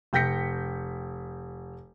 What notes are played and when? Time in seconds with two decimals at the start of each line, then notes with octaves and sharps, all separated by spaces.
0.13 F1 G5 G6 A#6 B6 C#7